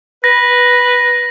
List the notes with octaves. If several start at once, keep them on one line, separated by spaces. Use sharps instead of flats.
B4 A#6